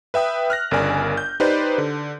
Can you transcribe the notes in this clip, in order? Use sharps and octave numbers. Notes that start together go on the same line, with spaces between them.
B4 E5 G5 D#6
F6 F#6 A#6
G1 C#3 A#4 D5 G#5
G6
D#4 G4 B4 C5 D5
D3